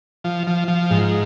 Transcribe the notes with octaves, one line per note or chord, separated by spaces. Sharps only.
F3
F3
F3
G#2